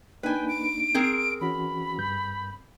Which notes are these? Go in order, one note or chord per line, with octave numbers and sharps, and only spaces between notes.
A#3 D4 D#4 B4 G5 G#5
D7
C4 G#4 A#4
E3 C#4 F#4 B5
G2 G6